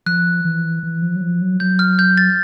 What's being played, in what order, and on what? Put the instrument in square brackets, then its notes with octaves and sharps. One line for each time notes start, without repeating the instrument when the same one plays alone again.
[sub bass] F3 [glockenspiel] F#6
[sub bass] E3
E3
F3
F#3
F3
F#3
[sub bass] F#3 [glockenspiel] G6
[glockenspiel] F6
G6
A6